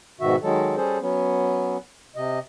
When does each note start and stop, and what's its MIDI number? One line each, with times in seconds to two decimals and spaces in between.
0.21 0.36 44
0.21 0.36 47
0.21 0.36 51
0.21 0.36 66
0.21 0.36 76
0.43 0.76 51
0.43 0.76 54
0.43 0.76 56
0.43 0.76 69
0.77 0.99 55
0.77 0.99 61
0.77 0.99 68
0.77 0.99 69
0.77 0.99 72
1.01 1.77 54
1.01 1.77 59
1.01 1.77 61
2.16 2.39 48
2.16 2.39 75